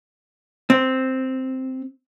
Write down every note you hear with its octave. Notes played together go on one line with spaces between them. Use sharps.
C4